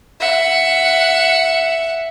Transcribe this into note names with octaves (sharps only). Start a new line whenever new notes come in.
E5 F#5